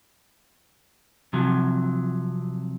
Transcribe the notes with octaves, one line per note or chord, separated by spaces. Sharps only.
C3 F3 F#3